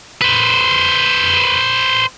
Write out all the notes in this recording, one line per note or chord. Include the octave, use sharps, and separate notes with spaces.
B4 C5